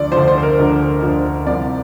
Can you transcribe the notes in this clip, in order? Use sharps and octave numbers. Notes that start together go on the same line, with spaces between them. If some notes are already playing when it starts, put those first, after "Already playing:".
Already playing: D2 D3 F3 D5
D2 D3 F3 C5
C5
C5
A#4
D2 D3 F3
D2 D3 F3
C2 C3 F3 D5